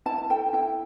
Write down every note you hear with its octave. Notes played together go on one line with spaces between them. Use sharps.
E4 A5
A5
A4 G5
E4 G5